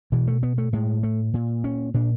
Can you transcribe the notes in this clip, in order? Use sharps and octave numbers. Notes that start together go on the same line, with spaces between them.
B2 E3
A3
B3
A3
A2 G#3
A3
A#2
C#4
A#2 D4